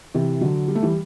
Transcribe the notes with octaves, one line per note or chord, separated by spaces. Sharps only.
C3 E3
D3 F#3
G3
A3
E3 G3